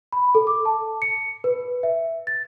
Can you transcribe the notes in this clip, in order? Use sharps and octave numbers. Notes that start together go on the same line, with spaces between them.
B5
A4
D6
A5
C#7
B4
E5
A6